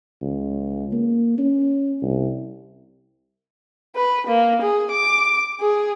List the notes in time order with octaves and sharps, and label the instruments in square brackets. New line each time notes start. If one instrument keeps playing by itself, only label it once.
[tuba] C#2
A#3
C#4
C2
[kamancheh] B4
A#3
G#4
D6
G#4